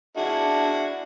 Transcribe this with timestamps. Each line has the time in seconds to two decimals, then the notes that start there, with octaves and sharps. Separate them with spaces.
0.17 D4 E4 F#4 G#4